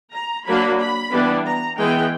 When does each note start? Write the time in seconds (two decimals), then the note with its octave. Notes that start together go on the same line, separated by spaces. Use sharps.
0.13 A#5
0.46 F#3 A#3 D4 B5
0.79 B5
1.12 E3 G3 B3 D4
1.45 A#5
1.78 E3 G#3 B3 G5